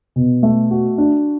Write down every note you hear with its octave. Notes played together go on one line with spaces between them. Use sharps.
B2
A3
F#4
D4